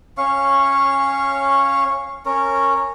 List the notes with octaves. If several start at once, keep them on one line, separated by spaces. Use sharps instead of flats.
C#4 C#5 F5 C#6
C#4 A#4 C#5